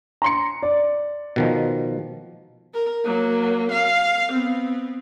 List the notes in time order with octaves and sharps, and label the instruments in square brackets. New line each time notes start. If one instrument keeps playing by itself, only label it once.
[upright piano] A#5 C6 C#7
D5
[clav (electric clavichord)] B2 D#3 F3
[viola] A#4
F#3 A#3
F5
B3 C4